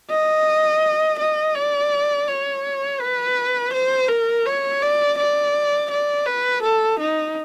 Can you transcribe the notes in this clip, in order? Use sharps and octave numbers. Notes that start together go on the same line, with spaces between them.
D#5
D#5
D5
C#5
B4
C5
A#4
C#5
D5
D5
D5
B4
A4
D#4